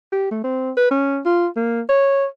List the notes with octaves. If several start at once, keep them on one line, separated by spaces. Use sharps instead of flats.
G4
A3
C4
B4
C#4
F4
A#3
C#5